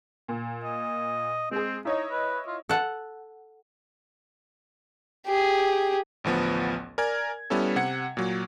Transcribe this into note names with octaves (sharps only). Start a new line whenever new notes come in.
A#2
D#5
G#3 C4 G#4
D#4 E4 C#5 D#5
B4
F4
A4 F#5
G4 G#4
A1 D2 F3 B3
A#4 D5 G#5 G#6
G3 B3 C#4 E4 A4
C3 F#5 G#6 C#7
A#2 F#3